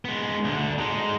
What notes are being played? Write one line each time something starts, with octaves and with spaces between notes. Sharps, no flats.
G#3 B3
D2 D3
G#3 D#4